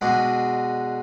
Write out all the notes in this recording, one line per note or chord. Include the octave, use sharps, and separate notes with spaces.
B2 G#3 D4 F#4